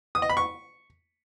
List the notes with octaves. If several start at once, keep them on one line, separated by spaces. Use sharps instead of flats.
D#6
D#5
B5
C#6